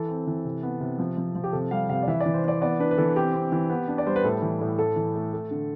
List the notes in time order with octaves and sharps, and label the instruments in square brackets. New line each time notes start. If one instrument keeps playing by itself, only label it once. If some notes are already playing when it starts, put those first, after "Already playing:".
Already playing: [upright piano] E3 A4
C4
E3
C3
B3
C3
F3
F3
F3
G4
C3 A4
G3 F5
C3 F5
D5
E3 E5
D5
E3
C5
E3 D5
B3 D5
D4 B4
B4
E3 A4
C4 G4
C4
E3
B3
D4
D5
G3 C5
B4
A2 A4
E3
A2
A3 A4
E3
A3
A3
D3